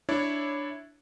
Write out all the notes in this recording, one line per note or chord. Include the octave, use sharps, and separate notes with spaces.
D4 E4 C#5 D5